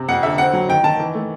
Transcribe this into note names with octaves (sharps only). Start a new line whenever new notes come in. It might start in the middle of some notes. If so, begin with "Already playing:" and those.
Already playing: C3
F2 F#5
D3 E5
C4 F#5
F#3
D#3 G5
D#3 A5
E3
A3